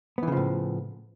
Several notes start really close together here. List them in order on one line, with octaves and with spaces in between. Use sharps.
B3 E3 C#3 F3 A2